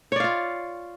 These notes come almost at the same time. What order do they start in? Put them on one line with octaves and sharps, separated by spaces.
C#5 D5 F5 F4